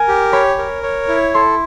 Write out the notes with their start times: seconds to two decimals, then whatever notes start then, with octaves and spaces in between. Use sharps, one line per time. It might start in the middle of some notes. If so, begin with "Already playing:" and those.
Already playing: A#4 G#5
0.08 G4
0.33 C#5 B5
0.58 A#4
0.83 C#5
1.08 E4
1.34 A4 C6